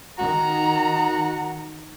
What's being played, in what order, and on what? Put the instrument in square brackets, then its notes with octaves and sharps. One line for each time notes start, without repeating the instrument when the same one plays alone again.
[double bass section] D#3 [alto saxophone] F#4 [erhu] A#5